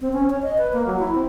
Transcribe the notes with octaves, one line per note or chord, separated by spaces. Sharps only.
C4
C#4
C#5
D#5
B4
A#3
F#3
E4
C4